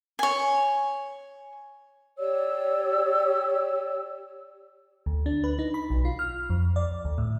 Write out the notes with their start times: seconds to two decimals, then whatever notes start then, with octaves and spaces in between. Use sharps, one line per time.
0.19 C#5 G#5
2.18 G4 C#5 D5 E6
5.06 D2
5.26 D4
5.44 B4
5.59 D#4
5.74 B5
5.90 B1
6.05 F4
6.19 F6
6.50 F2
6.76 D5
7.05 D2
7.18 A2